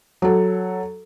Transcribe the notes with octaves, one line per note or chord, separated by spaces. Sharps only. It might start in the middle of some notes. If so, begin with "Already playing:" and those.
F#3 A4